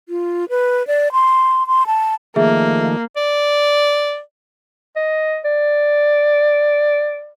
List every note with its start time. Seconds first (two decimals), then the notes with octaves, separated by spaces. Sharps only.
0.09 F4
0.49 B4
0.87 D5
1.12 C6
1.67 C6
1.87 A5
2.36 D#3 F3 A3 A#3 G#4 E5
3.16 D5
4.96 D#5
5.45 D5